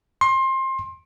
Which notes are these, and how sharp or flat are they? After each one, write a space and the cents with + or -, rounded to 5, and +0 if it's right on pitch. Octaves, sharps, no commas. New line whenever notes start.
C6 +25